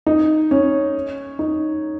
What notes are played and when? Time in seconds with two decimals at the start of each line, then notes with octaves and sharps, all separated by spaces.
0.07 D#4
0.51 C#4
1.39 D#4